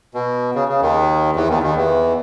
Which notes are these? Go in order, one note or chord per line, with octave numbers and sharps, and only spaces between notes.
B2
C#3
C#3
D#2 D#3
E2 E3
D#2 D#3
D#2 D#3
E2 E3